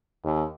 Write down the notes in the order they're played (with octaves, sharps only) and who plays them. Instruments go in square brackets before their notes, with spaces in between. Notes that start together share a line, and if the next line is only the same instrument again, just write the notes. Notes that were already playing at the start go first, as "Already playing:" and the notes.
[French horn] D#2